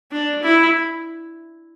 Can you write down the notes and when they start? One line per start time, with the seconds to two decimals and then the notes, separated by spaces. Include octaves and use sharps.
0.12 D4
0.43 E4